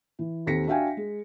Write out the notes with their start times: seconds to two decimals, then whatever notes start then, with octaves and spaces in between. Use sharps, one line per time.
0.19 E3
0.46 D#2 C4 A4 A#6 B6 C#7
0.67 D4 F#4 E5 F5 G5 G#5
0.97 G#3